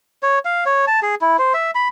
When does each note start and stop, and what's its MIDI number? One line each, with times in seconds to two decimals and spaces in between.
0.23 0.39 73
0.45 0.64 77
0.66 0.85 73
0.87 1.00 81
1.03 1.15 68
1.21 1.37 64
1.39 1.53 72
1.54 1.71 76
1.75 1.88 83